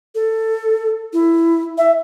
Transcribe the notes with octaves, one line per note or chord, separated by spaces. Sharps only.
A4
E4
E5